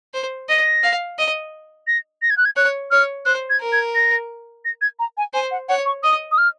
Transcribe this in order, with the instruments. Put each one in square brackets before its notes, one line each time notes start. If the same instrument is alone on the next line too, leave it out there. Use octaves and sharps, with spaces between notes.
[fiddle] C5
[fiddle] D#5 [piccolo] A#6
[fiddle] F5
D#5
[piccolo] A#6
A#6
G#6
F#6
G#6
[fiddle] C#5 [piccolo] F#6
[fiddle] C#5 [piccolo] F6
[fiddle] C5 [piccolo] F#6
[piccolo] G#6
[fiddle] A#4
[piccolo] G#6
A#6
A#6
G#6
A#5
G#5
[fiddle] C5 [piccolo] G#5
[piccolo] F#5
[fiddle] C#5 [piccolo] F#5
[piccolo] C#6
[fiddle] D#5 [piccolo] D#6
[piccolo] D#6
F6